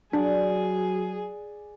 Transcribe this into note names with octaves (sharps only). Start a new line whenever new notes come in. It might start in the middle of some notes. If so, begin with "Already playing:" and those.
F#3 D4 G#4 D5 F#5 C6